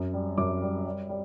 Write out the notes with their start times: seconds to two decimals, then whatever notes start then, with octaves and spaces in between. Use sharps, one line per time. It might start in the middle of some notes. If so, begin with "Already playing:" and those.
Already playing: F#2
0.14 G3
0.38 F#2 D6
0.62 G3
0.86 G3
1.09 G3